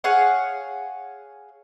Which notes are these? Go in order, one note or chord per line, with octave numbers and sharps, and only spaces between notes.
G#4 C#5 F5 F#5